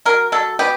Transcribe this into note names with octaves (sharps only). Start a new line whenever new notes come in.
F#3 A#4
F#3 A4
B3 G4